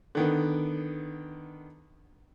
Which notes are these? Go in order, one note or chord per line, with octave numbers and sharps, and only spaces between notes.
D3 D#3 B3